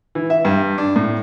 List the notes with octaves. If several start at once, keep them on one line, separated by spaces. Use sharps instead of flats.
E3
E5
G2
D4
A2